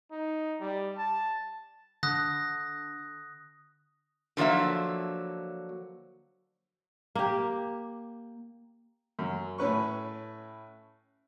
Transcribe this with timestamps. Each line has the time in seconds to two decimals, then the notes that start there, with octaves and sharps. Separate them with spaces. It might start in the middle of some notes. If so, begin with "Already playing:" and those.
0.11 D#4
0.61 G3
0.97 A5
2.03 D3 D#6 F#6 A#6
4.37 D3 F3 F#3 A#3 E5
7.15 A#3 G4
9.19 F#2
9.58 A2 C#4 B4 C#6